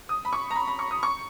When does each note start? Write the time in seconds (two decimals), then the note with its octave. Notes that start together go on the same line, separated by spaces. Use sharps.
0.09 D#6
0.25 B5
0.33 C#6
0.51 A#5
0.56 B5
0.68 B5
0.79 C#6
0.91 D#6
1.03 C#6